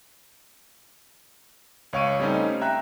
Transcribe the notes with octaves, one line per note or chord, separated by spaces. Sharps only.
C#2 C#5 F5 C#6 D7 D#7
G3 A3 C4 C#4 D#4
E5 G5 A#5 F#6